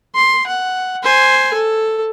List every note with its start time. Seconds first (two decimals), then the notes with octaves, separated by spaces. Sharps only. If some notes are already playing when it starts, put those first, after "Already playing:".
0.15 C6
0.46 F#5
1.03 C5 G#5
1.53 A4